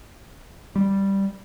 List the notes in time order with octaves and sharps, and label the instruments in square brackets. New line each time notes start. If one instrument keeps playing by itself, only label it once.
[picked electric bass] G3